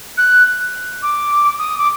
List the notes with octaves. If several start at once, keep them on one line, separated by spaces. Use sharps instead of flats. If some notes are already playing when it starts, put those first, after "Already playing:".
F#6
D6
D#6
D6